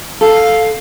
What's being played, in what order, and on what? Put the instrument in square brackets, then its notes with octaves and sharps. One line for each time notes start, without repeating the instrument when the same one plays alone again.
[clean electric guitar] A4 [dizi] F5